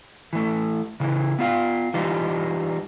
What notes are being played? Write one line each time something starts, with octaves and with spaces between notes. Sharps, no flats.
E3 A3
C#3 E3
B3 F4 F5
E3 G3 D#4 F4